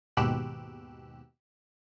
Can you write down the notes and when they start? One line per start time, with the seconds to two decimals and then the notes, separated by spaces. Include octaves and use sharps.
0.17 D#2 G#2 B2 G4 E6 F#6